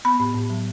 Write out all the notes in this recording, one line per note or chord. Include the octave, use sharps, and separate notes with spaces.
B3 B5
A2
A2
F#3